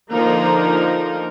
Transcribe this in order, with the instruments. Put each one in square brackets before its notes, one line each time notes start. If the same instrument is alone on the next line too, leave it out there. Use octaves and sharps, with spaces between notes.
[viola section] D3 F3 A#3 D#4 A#4